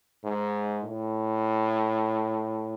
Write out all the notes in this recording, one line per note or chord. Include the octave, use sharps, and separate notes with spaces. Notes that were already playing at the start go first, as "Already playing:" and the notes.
G#2
A2